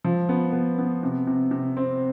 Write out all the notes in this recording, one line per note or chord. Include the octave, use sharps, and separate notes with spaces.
F3
B3
B3
B3
C3
C3
C3
C4